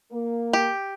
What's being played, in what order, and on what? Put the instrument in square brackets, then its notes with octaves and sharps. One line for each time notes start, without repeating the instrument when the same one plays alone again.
[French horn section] A#3
[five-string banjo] G4